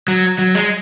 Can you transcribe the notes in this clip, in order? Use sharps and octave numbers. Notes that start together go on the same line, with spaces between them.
F#3
F#3
G#3